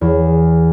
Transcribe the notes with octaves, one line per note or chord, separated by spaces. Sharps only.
E2